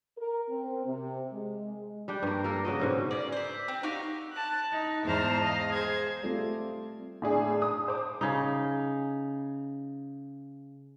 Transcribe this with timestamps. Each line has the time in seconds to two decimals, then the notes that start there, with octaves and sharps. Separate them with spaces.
0.17 A#4
0.49 C4
0.86 C3
1.31 G#3
2.08 G3 D4 G5
2.23 G2 A#3
2.44 A#3 A4 A#4
2.65 C#3 F#4 D#5
2.80 G#2 B2 D3
3.11 A#3 C#4 D5
3.32 C5 E5
3.68 C4
3.83 D#4 F#4 G4 F5
4.34 A5 F#6
4.72 D#4
5.04 E2 G#2 C5 A5 A#5 F6
5.43 D#5 F5
5.73 G#4 C5 G#6
6.23 G3 A3 C4 F4 A4 D5
7.22 A2 D4 G#4
7.62 D#6
7.88 C5 D6
8.21 C#3 D#4